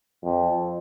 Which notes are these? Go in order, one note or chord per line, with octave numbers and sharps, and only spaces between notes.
F2